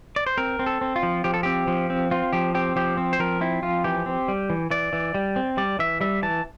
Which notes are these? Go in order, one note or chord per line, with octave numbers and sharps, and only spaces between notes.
D5
C5
C4 A#4
C4
A4
C4
F4
F3
F3 G4
A4
C4 G4
F3
C4
C4 F4
F3 G4
C4 G4
F3 G4
C4
C5
F3 A#4
C4 E4
F3 F4
E3 G4
C4
G3
E3
E3 D5
E3
G3
C4
G3 D5
E3 E5
G3 E5
E3 A5